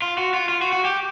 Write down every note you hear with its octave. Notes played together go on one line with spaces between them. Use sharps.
F4
F#4
F4
F4
F#4
F#4
G4